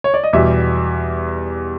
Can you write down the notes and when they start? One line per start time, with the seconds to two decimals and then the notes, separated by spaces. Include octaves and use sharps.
0.04 C#5
0.14 D5
0.24 D#5
0.33 E2 B2 G3 E5